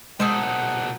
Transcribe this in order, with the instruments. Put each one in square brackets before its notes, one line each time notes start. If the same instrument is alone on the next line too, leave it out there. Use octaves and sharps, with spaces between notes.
[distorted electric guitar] B1 A#2 [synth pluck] G#3 [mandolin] G#4 A4 C5 [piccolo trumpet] F#5